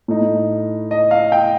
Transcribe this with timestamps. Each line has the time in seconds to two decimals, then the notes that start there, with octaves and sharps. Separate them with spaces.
0.08 A2 A3 D#4
0.91 D#5
1.11 F5
1.32 G5